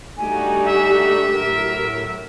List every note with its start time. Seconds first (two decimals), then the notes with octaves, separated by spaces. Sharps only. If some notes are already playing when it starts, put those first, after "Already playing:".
0.17 D3 G3 A3 D#4 F#4 G4 G#5
0.65 E5
1.32 A2 F#3 A#4